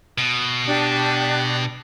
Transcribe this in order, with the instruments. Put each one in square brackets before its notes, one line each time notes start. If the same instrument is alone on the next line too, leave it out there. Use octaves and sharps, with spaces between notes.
[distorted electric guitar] B2
[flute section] D4 G4